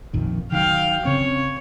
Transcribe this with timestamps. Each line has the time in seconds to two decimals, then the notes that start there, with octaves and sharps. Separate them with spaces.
0.14 A#1 F2 D#3
0.52 D#3 E3 F#3 F5 G5
1.05 C#3 C4 C#5